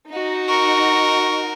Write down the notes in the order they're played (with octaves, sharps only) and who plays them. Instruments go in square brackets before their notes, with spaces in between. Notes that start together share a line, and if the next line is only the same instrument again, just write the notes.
[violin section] D#4 F#4
[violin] A#4 [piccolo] C#6